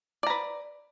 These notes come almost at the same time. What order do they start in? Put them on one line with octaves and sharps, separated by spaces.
D5 A#5 B4